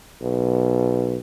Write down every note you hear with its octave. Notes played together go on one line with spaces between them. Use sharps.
B1